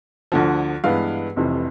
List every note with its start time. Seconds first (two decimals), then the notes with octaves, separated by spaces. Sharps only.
0.32 D2 D3 F3
0.84 G2 E3 G#3 B3 F5
1.36 F1 F2 C3 E3